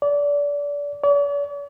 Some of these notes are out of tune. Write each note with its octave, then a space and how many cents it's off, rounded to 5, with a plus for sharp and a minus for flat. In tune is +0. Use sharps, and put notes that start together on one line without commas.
D5 -25
D5 -45